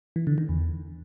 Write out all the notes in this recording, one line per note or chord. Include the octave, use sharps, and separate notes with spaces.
E3
D3
D#3
E2